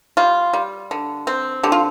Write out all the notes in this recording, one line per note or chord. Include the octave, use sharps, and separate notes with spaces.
G3 F4
G3
D3
C4
D3 G4
F4